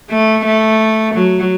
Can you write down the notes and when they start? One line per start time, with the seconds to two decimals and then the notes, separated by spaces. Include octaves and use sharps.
0.10 A3
0.45 A3
1.14 F#3